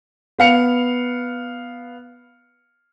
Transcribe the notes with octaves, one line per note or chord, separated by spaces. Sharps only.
B3 F5 C#7 F7